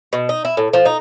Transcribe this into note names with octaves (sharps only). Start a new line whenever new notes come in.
B2
D#4
E4
A2
F3
D#4